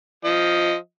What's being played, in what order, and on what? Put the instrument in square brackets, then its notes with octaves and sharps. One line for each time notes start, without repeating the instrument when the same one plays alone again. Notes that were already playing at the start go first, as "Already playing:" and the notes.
[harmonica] F3 D#5